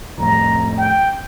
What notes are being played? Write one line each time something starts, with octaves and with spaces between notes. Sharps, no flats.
C2 F2 A2 A#5
G5